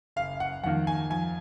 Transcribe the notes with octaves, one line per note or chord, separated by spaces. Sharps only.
F#1 F5
F#5
F2 D#3 A#3 F#5
G#5
F2 G#5